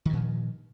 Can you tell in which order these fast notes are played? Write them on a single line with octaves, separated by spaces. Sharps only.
D#3 G2 A#2 F3